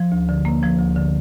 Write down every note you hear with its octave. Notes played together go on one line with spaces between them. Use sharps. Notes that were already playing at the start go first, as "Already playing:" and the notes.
Already playing: F3
D2
D3
A#3
F3
D2
D3